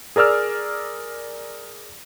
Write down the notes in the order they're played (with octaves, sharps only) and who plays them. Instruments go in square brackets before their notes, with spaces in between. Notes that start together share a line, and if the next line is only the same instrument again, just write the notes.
[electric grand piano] G#4 A#4 D5 E6 F6